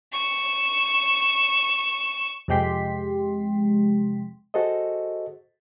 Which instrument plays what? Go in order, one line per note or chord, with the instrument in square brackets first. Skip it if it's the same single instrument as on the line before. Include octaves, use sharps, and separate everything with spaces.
[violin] C#6 E7
[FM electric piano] F2 C3 G#3 G4 C6 B6
[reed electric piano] F#4 G#4 A4 C5 D#5